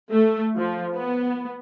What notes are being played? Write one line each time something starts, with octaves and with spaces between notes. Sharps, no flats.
A3
F3
B3